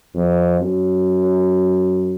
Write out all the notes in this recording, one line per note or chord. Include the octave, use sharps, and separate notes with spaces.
F2
F#2